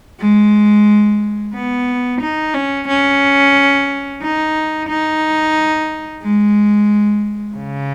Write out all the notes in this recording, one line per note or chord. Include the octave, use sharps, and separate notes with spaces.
G#3
B3
D#4
C#4
C#4
D#4
D#4
G#3
C#3